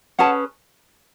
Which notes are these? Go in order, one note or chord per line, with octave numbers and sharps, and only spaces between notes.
C#4 G#4 B4 F#5 A5